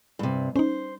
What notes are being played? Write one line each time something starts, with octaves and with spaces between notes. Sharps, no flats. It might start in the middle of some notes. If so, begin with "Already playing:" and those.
G2 C3
C#4 D#4 C5